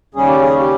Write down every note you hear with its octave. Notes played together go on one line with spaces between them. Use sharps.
D#2 C#3 G3 C#4 G#4
G4
G#4
G4